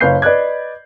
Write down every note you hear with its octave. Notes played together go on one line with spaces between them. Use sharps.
F#1 B4 C#5 F5 G6 C7
B4 D5 D#5 F#6 G#6